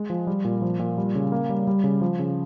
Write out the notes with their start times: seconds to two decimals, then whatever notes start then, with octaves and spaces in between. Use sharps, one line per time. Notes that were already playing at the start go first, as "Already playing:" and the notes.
Already playing: G#3
0.10 F3
0.27 G3
0.45 A#2
0.62 F3
0.79 A#2
0.98 G3
1.15 C#3
1.32 A#3
1.50 G3
1.67 G3
1.84 C#3
2.01 F3
2.19 C#3